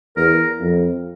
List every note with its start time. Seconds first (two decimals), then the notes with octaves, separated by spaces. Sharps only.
0.16 E2 A#4
0.60 F2